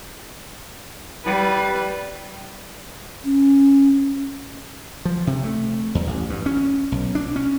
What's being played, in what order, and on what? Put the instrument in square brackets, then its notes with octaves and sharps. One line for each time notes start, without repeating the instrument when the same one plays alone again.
[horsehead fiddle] G3 B4
[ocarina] C#4
[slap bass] F3
C3
A3
E2
A1
G2
C#4
B1
D4
C#4